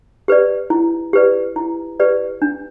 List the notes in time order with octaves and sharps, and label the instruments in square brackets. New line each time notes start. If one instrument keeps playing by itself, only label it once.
[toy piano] G4 B4 D5
E4
G4 B4 D5
E4
G4 B4 D5
D4